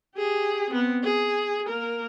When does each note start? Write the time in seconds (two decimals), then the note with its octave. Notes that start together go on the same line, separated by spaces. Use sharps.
0.16 G4 G#4
0.70 B3 C4
1.03 G#4
1.67 A#3 A#4